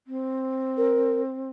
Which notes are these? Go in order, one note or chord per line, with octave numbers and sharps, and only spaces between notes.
C4
A#4